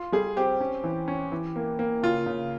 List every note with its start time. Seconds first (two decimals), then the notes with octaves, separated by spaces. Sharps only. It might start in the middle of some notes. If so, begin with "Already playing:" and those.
Already playing: F4
0.12 G3 G#4
0.36 C4 G4
0.60 C#4
0.84 E3
1.08 C#4
1.32 E3
1.56 A#3
1.79 A#3
2.03 C#3 F4
2.26 C#3